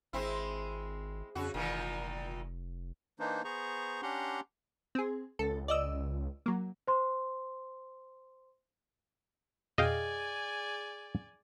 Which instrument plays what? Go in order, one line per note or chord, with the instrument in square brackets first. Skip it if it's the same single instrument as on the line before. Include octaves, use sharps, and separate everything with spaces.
[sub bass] G#1 [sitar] G#3 C4 E4
[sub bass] F2 [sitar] C#3 F#4
[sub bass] F1 [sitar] A#2 D#3 E3
[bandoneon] E3 A#3 D4 D#4 C5
B3 G#4 C5 A#5 C#6
C#4 D4 G4 F#5 A#5 C6
[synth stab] C4 G#4
[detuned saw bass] C#2 [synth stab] A4
[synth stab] D5 D#5 E6
F#3 A#3
[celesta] C5 C6
[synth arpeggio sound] F2 B2 [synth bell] G#4 [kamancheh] D5 G#5 [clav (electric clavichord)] D#5 F5 G5